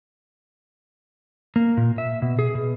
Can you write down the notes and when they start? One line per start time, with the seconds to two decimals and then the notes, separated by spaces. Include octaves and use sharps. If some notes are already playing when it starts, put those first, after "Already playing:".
1.56 A#3
1.77 A#2
1.98 E5
2.22 B2
2.39 G#4
2.55 B2